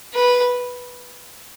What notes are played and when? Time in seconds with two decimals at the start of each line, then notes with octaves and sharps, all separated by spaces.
0.14 B4